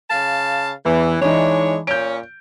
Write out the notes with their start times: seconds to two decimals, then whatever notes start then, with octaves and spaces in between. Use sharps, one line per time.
0.10 C#3 F5 A5
0.85 E2 E3
1.21 E3 G#3 D4 D#4 C#5
1.87 A#2 C#4 C#5 G6 D7